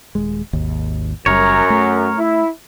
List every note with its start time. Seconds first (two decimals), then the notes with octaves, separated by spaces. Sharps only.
0.15 D#1 G#3
0.53 G#1 D#2
1.26 F#1 F#2 G3 A#4 C#5
1.70 A3
2.18 E4